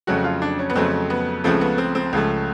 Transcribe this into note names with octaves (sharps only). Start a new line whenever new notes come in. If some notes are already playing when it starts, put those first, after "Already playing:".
F2 C#3 F#3 A3 F#4
F4
D4
C#4
B3
F2 C#3 F#3 A3 C4
B3
C#2 C#3 F3 A3 C4
B3
C4
C4
C#2 C#3 F3 A3